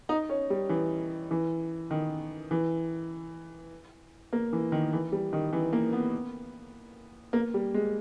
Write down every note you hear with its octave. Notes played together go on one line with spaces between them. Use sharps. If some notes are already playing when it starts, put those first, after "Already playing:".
D#4
C#4
G3
E3
E3
D#3
E3
A#3
E3
D#3
E3
G3
D#3
E3
A#3
B3
A#3
G3
G#3